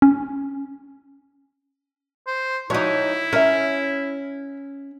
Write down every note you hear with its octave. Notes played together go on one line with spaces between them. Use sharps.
C#4
C5
F3 D#4 E4 F#4 G4 C#5
C#4 A#4 E5